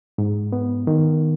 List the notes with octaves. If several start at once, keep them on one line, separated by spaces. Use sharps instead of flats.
G#2
B3
D#3